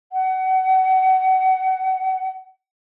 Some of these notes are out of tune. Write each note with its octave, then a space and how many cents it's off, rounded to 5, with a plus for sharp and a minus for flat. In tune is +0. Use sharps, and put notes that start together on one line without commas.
F#5 +30